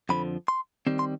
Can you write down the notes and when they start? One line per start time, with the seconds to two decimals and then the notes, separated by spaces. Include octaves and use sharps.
0.09 F2 D3 F3 B5
0.48 C6
0.87 D#3 G3 C4
0.99 C6